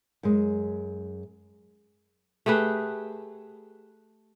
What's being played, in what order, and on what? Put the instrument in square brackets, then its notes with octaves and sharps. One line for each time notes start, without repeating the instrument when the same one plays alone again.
[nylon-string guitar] F#2 G#3
[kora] A3 G4 G#4 B4